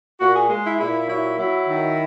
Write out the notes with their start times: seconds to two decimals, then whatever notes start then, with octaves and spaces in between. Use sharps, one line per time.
0.20 A#2 F#4
0.35 G#4
0.50 G#3
0.65 E4
0.79 A#2 E4
1.08 F#3 E4
1.38 F#3 E4
1.68 D#3